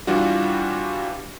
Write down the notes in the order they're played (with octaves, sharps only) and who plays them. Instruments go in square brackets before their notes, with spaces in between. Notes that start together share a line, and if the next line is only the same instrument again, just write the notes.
[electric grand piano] E3 G3 D4 F4 F#4